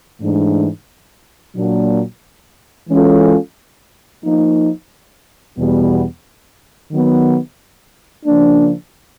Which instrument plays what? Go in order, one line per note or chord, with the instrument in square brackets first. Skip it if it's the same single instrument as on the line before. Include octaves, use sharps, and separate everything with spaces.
[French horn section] G#2 E3 A3 D4
A#2 F#3 A#3 D4 F#4
E3 G#3 C#4 F4 A4
F3 A#3 D#4
E2 B2 G3 B3
D#3 F#3 B3
C#3 F3 A#3 D4